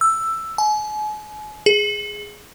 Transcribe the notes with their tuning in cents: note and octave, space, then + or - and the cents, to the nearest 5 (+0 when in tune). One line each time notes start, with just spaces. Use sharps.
E6 +10
G#5 +40
G#4 +0